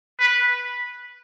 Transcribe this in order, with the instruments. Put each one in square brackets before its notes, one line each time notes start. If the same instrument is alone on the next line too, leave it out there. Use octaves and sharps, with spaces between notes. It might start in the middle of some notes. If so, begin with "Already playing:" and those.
[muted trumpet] B4